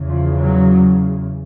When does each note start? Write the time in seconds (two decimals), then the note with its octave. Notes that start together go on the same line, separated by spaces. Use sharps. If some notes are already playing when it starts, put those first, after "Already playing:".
Already playing: E2 C#3
0.08 F3
0.38 F#3